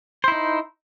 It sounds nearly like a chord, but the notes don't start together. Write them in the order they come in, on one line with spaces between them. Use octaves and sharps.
C5 E4 D#4